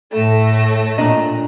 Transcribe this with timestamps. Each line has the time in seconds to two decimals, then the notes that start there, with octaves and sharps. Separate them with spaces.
0.12 A2 A3 A4
0.98 A#2 D4 D#5 A#5